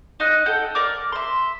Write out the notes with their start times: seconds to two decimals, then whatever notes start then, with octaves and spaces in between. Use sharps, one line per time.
0.20 D#4 D#5 F#6
0.46 A4 F#5 G5
0.75 A#4 D5 D6
1.12 E5 C6